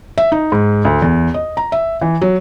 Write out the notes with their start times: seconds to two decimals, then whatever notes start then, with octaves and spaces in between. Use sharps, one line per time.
0.18 E5
0.32 D#4
0.52 G#2
0.85 D2
1.02 E2
1.34 D#5
1.57 A#5
1.72 E5
2.01 E3
2.22 F#3